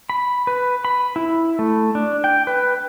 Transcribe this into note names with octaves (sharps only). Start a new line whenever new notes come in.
B5
B4
B5
E4
A3
D4
G5
B4